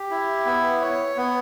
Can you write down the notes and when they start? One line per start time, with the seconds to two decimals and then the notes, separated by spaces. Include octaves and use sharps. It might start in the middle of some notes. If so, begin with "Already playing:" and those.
Already playing: G4
0.11 E4
0.46 B3
0.81 C#5
1.17 B3